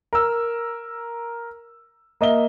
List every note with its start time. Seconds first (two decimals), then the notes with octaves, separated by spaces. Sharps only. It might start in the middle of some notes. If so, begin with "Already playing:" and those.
0.13 A#4 E6
2.21 A#3 D#5 E5 G7